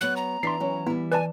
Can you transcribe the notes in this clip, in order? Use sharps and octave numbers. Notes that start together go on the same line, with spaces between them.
F#3 B3 F#6
A#5
E3 D4 E4 D5 C6 B6 C7
F#3 C#4 E4
G3 B3 E4
B4 D5 G#5 A5